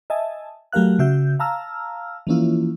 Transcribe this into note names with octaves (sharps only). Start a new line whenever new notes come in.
D#5 E5 G#5 A5
F#3 A3 G4 A#4 F5 F#6
C#3 F#4 E5 G6
F5 A5 A#5 E6 F6
E3 F3 A#3 C#4 E4 F4